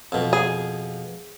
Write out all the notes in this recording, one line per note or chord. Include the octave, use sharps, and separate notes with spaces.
F2 B2
G#4